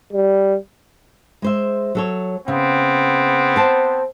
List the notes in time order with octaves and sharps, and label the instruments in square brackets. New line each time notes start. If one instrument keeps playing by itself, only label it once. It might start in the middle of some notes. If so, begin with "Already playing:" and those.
[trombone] G3
[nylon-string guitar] G#3 C5 E5
F#3 A4 C#5
[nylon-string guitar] C#3 [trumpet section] B3 C4
[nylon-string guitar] C5 A5